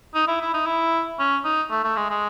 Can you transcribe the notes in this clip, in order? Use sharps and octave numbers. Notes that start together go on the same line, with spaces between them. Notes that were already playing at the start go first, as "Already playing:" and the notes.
D#4
E4
E4
D#4
E4
C#4
D#4
A3
A3
G#3
G#3